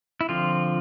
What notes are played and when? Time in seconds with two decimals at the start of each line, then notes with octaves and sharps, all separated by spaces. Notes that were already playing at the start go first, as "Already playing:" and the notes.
0.21 E4
0.29 D3 F3 C4 F4